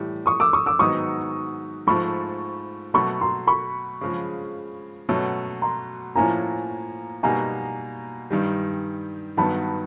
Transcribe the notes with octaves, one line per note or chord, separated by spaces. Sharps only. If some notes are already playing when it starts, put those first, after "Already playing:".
Already playing: A2 E3 G3
C#6 D#6
D6 E6
C#6 D#6
D6 E6
G#2 D#3 F#3 B3 D#4 C#6 D#6
G#2 F3 A3 B5 C#6
B2 F#3 A3 B5 C#6
A#5 C6
B5 C#6
C#3 F3 G#3
B2 F#3 A3 C#4
A#5 C6
A2 F3 A#3 C#4 E4 G#5 A#5
B2 G3 A#3 D#4 F#4 G#5 A#5
G2 D#3 G3
G2 D#3 F#3 B3 A5 B5